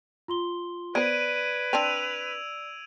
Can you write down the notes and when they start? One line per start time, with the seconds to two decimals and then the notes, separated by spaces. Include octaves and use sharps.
0.28 F4 C6 G7
0.95 B3 B4 C5 D5 G#6 D7 D#7
1.73 C4 D4 E6 D#7 F7